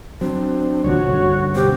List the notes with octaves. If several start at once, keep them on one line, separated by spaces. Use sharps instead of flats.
F#3 C4 D4
F1 D#2 A#2 F#4 C#5
C2 G2 D3
B2 G4 C5